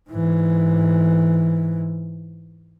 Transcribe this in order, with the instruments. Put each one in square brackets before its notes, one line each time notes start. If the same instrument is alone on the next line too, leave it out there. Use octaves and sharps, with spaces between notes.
[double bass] G#2 E3